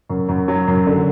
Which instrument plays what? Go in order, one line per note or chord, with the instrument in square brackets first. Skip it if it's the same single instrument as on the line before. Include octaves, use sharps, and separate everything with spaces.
[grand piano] F#2
F#2
F#3
F#2
D3